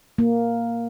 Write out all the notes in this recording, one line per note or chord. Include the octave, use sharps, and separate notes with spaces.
A#3